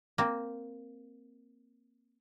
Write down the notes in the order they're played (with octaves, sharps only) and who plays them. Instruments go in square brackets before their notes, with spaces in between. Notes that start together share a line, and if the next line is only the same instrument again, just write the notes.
[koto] A#3 C4